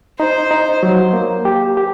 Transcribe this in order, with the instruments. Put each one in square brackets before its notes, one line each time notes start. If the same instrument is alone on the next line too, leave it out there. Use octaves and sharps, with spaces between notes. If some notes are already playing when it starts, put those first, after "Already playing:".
[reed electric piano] D#4 [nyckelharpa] C5
[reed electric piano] D#4
F#3
A#3
G4
G4